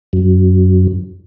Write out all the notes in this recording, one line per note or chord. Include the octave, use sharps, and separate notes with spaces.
F#2